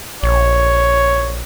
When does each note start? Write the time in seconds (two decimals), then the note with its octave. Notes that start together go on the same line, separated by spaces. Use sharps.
0.23 A#1 C#5